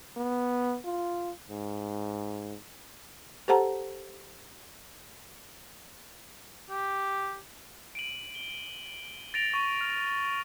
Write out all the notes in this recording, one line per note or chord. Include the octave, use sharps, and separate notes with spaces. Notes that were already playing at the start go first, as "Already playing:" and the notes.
B3
F4
G#2
G4 A4 C5 F#5 A5 A#5
G4
D7 D#7 F#7
G7
A6 A#6 D7 F7
C#6 D#7
F6 D7